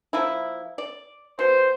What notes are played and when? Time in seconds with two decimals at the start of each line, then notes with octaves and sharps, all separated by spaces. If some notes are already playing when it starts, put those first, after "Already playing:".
0.13 F3 A#3 E4
0.78 D5
1.39 B2 C5